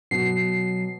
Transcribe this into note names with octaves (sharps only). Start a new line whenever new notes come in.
B2 F#3 C7